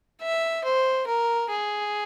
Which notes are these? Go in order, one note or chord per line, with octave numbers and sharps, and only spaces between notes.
E5
C5
A#4
G#4